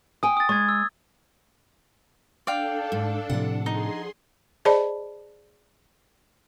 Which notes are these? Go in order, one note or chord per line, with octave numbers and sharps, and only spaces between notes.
G5 G#5 D#6
D#6 A6
G#3 C#6 G#6
E6
D4 A4 D5 F5 G5
G#2
A2 C3 F3 F#5
D#4 G#4 C6
G#4 C5 D5 D#5 A5 B5